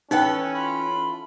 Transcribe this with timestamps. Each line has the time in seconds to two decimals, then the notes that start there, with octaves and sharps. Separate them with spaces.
0.11 E3 C#4 D#4 A4 B4 G5
0.54 F4 B5